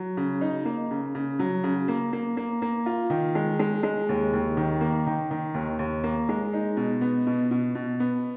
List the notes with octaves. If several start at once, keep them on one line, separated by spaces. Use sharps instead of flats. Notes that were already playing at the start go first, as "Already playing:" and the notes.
Already playing: F#3
C#3
D#4
A#3
C#3
C#3
F#3
C#3
A#3
A#3
A#3
A#3
F4
D#3
G#3
G#3
G#3
D#2
D#2
D#3
A#3
D#3
D#3
D#2
D#2
A#3
G#3
D#4
B2
B3
B2
B2
B2
B3